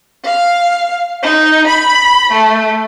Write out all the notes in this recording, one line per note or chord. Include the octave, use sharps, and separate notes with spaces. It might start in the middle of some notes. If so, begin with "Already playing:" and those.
F5
D#4
B5
A3